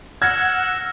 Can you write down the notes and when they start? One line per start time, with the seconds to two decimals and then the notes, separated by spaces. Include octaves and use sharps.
0.22 F#5 E6 F6 G#6 A#6